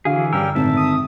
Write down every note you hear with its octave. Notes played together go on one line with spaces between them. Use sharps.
D3 E3 F#4 G#4 F5
G2 D3 G3 C#4 A#4 G5 E6
G#1 A2 E5 A5
D#6